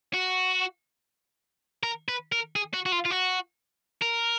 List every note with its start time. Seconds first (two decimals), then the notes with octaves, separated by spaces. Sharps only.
0.14 F#4
1.83 A#4
2.08 B4
2.32 A#4
2.56 G#4
2.74 F#4
2.86 F#4
2.92 F4
3.05 F4
3.10 F#4
4.02 A#4